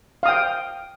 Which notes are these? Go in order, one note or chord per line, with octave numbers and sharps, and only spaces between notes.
F5 G5 D#6